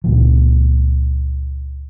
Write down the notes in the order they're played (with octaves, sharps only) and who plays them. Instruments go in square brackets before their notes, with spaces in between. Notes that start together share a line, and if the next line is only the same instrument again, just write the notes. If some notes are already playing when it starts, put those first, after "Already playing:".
[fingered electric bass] C#2 A#2 F3